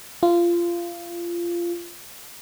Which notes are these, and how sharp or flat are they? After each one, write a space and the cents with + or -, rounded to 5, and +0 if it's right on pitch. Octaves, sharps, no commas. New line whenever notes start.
F4 -20